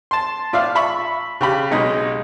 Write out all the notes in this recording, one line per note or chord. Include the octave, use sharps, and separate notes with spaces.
A5 C6
A2 F4 D5 E5 F5
E5 B5 C#6
C#3 G4 B5
B1 G#3 D#4 D#5